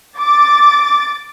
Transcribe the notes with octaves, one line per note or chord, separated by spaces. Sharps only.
D6 A6